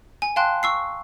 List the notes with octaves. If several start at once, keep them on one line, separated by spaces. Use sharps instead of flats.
G#5
F5 G5 A5 C6 F#6
C#6 E6 C7